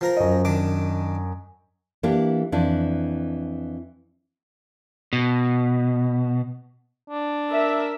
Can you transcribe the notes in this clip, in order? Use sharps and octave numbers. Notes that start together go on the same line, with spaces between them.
F3 A#4 A#5
F#2 D#5
D#3 D4 D6
E3 A#3 D4 G4
F2 E3 D4
B2
D4
A#4 E5